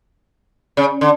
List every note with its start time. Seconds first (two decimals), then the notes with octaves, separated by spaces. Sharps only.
0.77 C#3
1.01 D3